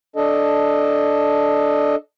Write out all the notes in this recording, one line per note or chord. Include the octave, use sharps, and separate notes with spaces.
D4 A4 D#5